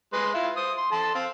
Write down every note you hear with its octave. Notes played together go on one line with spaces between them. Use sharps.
G#3 B4 C6
E4 F4
C5 D#6
C6
A4 A5 C6
C4 F5